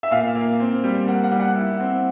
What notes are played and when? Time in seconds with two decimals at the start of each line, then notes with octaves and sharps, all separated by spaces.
0.03 E5
0.11 A#2 F5
0.35 A#3
0.60 C4
0.84 G3
1.07 A#3 F#5
1.24 F#5
1.32 G3
1.40 F#5
1.55 E4
1.80 C4